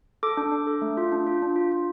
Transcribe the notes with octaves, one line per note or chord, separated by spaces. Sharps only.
A4 D6
D4
D4
A4
A3
F4
D4
F4
D4
F4
F4